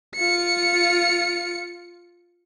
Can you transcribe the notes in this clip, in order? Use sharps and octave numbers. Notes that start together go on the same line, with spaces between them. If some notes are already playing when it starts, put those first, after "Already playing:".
F4 C#7